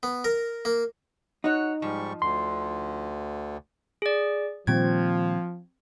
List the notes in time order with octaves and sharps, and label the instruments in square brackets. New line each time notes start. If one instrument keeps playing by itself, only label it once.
[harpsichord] B3
A#4
A#3
[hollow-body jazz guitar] D#4 [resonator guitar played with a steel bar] F#4 C#5
[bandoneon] G#2 G3 C#6 [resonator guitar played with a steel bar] F3
[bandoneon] D2 D3 [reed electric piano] C6
[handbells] G#4 D5
[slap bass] A#2 D#3 G3 [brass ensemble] F3 [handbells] C4 G#6